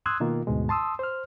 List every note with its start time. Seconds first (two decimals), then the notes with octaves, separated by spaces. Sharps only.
0.06 C6 D#6 E6 F#6 G#6
0.20 B2 D#3 A#3 F4
0.47 D2 G#2 B2 G#3
0.69 A5 C6 D#6 E6
0.99 C5 F6